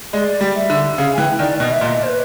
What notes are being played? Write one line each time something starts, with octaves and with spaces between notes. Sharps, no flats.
G#3 D5
G3
E5
D3
C#3 F5
G#5
E3 G5
D#3 D5
B2 D#5
E5
A#2 D#5
C5
B4